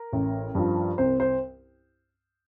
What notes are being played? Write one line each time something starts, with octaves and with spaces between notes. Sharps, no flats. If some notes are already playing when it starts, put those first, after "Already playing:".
Already playing: A#4
A1
G2 F3
C2 C5
C5